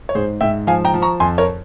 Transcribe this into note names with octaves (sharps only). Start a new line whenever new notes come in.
C#5
G#2 G#4 C5
G#2 E5 G5
F3 F5 G#5
G5 A#5
F3
A#5 C#6
F2 G#5 C6
A#4 C#5